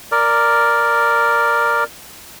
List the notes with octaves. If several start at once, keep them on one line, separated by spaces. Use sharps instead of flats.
A#4 D5